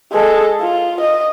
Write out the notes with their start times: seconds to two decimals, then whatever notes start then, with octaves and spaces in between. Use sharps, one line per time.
0.13 G#3 A4
0.61 F4
1.01 D#5